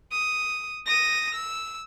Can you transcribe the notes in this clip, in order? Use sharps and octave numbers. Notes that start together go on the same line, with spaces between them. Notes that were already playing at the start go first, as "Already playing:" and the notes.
D#6
D#6 A#6
E6